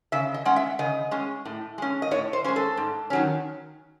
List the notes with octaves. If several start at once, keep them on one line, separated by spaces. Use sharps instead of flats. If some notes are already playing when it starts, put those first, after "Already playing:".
C#3 E5
D#5
G#3 C#4 F#5
E5
C#3 D#5
G#3 C#4
A2
G#3 C#4
D#5
A2 C#5
C5
G#3 C#4 C5
A4
G#2
D#3 F#3 C#4